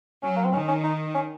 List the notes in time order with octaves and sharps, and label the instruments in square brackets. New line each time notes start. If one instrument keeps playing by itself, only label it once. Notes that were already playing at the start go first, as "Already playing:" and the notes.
[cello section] F#3 [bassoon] C#4
[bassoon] A#3
C4
[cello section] D#3 [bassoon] C#4
[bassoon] C#4
D#4
C#4